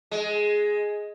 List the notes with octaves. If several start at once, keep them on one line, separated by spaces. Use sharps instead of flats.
G#3